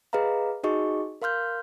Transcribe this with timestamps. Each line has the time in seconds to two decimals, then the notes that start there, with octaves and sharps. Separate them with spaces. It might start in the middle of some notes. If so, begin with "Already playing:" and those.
0.13 G#4 B4 D#5 F5 A#5
0.63 D#4 F#4 G#4 D#5 C#6
1.22 A#4 F5 C6 F6 G6